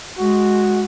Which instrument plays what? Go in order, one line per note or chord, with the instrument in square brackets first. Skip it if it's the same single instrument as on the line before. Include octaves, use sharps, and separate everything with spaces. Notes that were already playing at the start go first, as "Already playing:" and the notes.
[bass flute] G#3 [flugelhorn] F#4